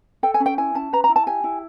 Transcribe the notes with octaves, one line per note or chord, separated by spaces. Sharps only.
A4 G5
G#5
C#4
G5
E4 G#5
C#4 A5
B4 A#5
A#5
E4
A5
G4 G#5
E4